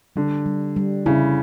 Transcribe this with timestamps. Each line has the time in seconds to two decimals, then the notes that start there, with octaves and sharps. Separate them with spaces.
0.16 D3 G3
0.46 G3
0.76 G3
1.06 C#3 E4